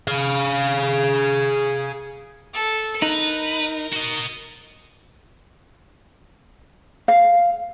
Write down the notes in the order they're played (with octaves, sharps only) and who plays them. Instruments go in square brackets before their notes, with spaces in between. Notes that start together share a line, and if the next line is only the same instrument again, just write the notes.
[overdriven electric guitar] G#4 F5
[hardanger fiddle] A4
[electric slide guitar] D#4 [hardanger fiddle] A#4 [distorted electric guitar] B4
[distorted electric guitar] F#4 D#5
[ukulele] F5